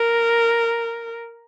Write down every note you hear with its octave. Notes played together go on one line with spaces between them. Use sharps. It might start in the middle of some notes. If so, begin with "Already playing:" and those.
Already playing: A#4